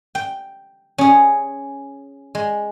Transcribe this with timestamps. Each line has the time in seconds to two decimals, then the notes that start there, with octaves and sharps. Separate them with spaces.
0.15 G5
0.98 C#4 G#4
2.35 G#3